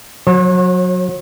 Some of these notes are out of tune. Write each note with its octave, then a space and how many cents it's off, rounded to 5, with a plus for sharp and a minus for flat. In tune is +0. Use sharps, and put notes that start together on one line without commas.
F#3 -20 C#5 -45